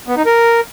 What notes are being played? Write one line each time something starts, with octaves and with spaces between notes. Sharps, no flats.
B3
D#4
A#4